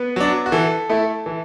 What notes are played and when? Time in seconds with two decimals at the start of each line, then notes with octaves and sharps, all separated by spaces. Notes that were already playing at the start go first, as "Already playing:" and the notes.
Already playing: B3 B4
0.16 F#3 D4
0.46 F#4
0.52 E3 A4
0.89 A3 E4
1.26 E3